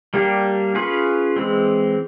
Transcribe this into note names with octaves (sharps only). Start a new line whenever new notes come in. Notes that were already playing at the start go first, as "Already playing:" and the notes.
G3 A#3 D4 G4
C#4 F4 G#4 B4
E3 G#3 C4